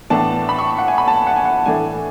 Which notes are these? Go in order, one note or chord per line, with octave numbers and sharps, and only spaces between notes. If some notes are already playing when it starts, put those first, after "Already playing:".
A2 E3 B3 D4 A5
B5
C#6
F#5
G#5
B5
A5
F#5
G#5
F#5
A2 E3 A3 D4 G#5